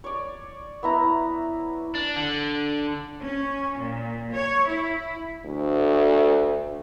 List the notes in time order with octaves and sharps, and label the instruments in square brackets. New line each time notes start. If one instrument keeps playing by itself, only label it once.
[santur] C#5 D5
B3 E4 A#5
[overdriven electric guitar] D4
D3
[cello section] C#4
A#2
C#5
E4
[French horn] D2